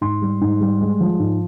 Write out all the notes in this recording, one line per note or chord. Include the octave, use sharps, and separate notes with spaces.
G#2 C6
G3
G#2
G3
G#3
F3
G#2